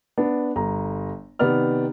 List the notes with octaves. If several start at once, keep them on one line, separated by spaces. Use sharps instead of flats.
B3 D4
G1 A#5
C3 D#3 B3 D#4 D5 F6